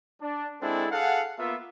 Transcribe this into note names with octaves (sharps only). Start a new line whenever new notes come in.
D4
G#3 C4 D4 E4 A4
G#4 A4 F5 F#5
A#3 B3 F4 E5